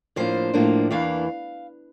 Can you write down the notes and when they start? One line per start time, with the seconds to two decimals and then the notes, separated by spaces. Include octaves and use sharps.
0.16 A2 F3 A#3 D4 C5
0.54 A2 F3 A#3 D4
0.90 E2 E3 A#3 D4 F5